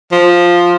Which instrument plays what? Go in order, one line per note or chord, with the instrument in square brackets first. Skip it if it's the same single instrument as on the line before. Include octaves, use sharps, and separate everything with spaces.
[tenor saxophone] F3